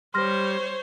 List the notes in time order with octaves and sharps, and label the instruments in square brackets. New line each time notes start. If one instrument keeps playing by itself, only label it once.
[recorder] G3 [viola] C5 C#5 [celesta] C6 F6 A#6